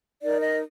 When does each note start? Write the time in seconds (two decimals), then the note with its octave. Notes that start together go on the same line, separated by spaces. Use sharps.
0.22 D#4 A#4 D5
0.41 D#5